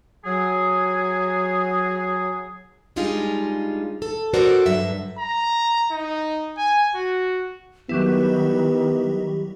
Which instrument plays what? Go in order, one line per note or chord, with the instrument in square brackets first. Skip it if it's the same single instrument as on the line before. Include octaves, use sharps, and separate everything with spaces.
[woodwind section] F#3 G#4
[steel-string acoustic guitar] G3 G#3 D4 D#4 F4 G#4
A4
F#4 A4 A#4 C5 D5
G2 D3 F#3 E5
[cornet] A#5
D#4
G#5
F#4
[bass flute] D#3 [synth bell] F#3 G3 E4 [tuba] B3 [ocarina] G4